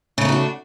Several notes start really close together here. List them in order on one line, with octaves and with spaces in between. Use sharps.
C#3 A3 D#4 F#4 D4